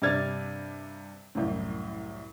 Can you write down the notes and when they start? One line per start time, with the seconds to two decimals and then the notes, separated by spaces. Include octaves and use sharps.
0.02 G2 C3 D5 F6 G#6 A6
1.35 C2 F#2 A2